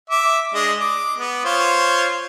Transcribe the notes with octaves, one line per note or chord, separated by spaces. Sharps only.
E5 D6
G#3 D4 D#5
D6
B3
F4 C5 C#5